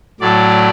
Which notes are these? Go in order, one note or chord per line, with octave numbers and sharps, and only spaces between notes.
A2 F#3 A3 D5